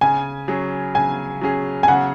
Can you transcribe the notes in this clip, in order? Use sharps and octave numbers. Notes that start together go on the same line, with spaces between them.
C#3 G#5
F#3 C#4 G#4
C#3 G#5
F#3 C#4 G#4
G#5
C#3 F#5